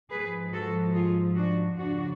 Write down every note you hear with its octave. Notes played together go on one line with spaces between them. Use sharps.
G#2 F3 G#4 B4
F#4 A4
F4 G#4
D4 F#4
F2 C#3 F3 D4 F#4